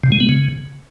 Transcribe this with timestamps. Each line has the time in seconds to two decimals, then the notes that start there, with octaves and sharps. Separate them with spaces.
0.03 C3
0.12 G#3
0.20 B3
0.29 C#3